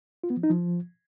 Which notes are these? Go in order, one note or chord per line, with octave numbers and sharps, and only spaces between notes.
F4
B3
F3
D#4
F3